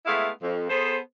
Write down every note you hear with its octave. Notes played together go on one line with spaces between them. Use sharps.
G#3 A3 B3 E4 F5
F2
B3 G#4 A4 C5